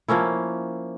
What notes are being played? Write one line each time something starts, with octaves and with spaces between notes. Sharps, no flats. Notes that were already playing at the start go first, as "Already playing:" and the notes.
F3 A#3 C#4 E4